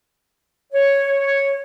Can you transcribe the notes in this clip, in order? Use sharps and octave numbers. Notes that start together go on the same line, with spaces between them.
C#5